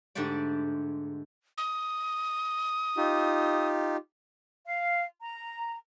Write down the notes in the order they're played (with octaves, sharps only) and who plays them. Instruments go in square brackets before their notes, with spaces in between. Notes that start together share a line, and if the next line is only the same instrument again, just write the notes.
[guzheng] G#2 D3 A3 G4 D5
[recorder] D#6
[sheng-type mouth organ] D#4 F4 G4
[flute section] F5
A#5